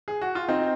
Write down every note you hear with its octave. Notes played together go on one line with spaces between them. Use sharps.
G#4
F#4
F4
C4 D#4